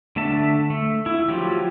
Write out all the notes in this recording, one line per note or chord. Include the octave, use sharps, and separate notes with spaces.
D3 A3 E5 A5
A3
E4
F3 F#3 F4 G4